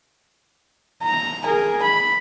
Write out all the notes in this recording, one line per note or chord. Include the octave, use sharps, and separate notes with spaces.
A#5
G#4 A#4
B5